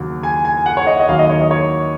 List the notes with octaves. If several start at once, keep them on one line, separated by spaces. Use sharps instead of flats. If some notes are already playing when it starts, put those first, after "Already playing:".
Already playing: D#2 C#3 F#3
G#5
G#5
F#5
C#5
D#5
D#5
D#2 D#3 F#3 F5
D#5
C#5
D#5
C#5